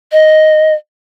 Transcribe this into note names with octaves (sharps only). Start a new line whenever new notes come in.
D#5